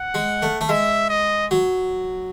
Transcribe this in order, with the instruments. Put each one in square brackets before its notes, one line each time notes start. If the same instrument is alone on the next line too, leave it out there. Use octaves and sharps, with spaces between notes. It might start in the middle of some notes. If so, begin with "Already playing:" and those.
Already playing: [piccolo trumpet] F#5
[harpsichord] G#3
A3
A3
[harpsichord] G#3 [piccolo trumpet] E5
[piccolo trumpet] D#5
[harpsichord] F#3